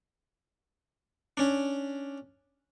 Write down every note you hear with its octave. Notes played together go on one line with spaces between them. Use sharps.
C#4 D4